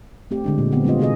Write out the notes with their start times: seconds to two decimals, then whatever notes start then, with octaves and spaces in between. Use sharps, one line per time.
0.31 A3 C4 G4
0.44 D3 G#3 D4
0.58 A#2
0.72 D3 B3 C4
0.84 G3 G#3 C4 F4 D#5
0.99 C3 C4 F#4 G#4 B4 D#5